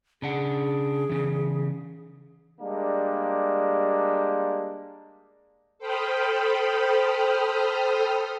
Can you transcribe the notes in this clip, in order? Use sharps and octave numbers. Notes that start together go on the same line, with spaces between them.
C#3 D4 G#4 F#5
C#3 E3
G3 G#3 A#3 D4
A4 C5 G5 B5 D#6 F6